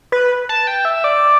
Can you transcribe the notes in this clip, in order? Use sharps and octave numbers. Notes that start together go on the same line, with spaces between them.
B4
A5
G5
E5
D5